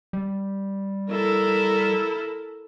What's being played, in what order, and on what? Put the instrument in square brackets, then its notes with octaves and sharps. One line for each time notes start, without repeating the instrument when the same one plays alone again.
[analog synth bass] G3
[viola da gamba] E4 A4 A#4